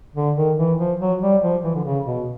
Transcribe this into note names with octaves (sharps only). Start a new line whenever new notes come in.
D3
D#3
E3
F3
F#3
G3
F3
E3
D3
C#3
B2